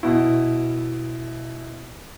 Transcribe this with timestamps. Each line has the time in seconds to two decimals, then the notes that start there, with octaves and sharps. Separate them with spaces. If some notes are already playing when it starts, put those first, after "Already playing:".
0.03 B2 E4